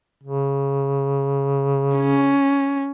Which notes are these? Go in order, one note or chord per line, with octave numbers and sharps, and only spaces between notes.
C#3
C#4